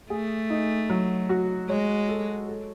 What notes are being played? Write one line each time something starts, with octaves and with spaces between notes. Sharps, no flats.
A3 G#4
D#4
F#3
F#4
G#3 C#5
A4
A4